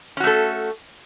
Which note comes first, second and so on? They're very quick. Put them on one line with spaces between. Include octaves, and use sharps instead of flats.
C#4 F#4 A3 A4